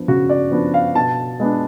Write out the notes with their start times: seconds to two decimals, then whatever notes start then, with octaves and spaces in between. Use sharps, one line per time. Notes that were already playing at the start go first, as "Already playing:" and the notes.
Already playing: F3 B3 D4
0.08 C#3 F#4
0.30 D5
0.51 F3 B3 D4
0.74 F5
0.95 B2 A5
1.40 G#3 B3 D4